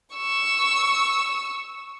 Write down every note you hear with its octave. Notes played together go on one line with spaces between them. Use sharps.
C#6 E6